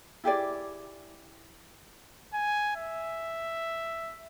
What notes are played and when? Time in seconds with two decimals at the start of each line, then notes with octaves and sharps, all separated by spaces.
0.24 E4 G4 G#4 D5
2.33 G#5
2.76 E5